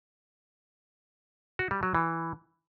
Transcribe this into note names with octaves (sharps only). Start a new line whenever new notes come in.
F#4
G3
F#3
E3